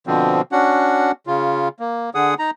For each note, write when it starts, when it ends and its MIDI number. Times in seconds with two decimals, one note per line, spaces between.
0.07 0.41 47
0.07 0.41 50
0.07 0.41 53
0.07 0.41 60
0.52 1.12 61
0.52 1.12 62
0.52 1.12 66
0.52 1.12 78
1.27 1.68 49
1.27 1.68 65
1.79 2.10 58
2.15 2.34 50
2.15 2.34 68
2.15 2.34 78
2.15 2.34 87
2.39 2.51 63
2.39 2.51 82